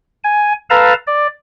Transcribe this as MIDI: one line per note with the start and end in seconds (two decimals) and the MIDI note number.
0.24 0.53 80
0.70 0.94 69
0.70 0.94 71
0.70 0.94 77
0.70 0.94 81
0.70 0.94 82
1.07 1.27 74